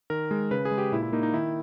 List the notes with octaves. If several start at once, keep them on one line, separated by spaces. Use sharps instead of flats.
D#3 A#4
G#3
C#3 B4
G#4
G#3
G4
A#2 E4
E4
A#3 D#4
D#4
D#3 E4